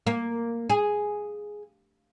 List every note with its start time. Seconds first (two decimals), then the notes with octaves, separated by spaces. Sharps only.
0.07 A#3
0.70 G#4